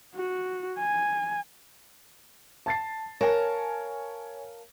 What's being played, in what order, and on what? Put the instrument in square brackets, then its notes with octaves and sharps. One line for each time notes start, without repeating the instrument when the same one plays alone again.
[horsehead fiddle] F#4
G#5
[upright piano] A5 A6 C7
[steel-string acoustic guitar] A#4 F5 A5 [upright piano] C#5 G#5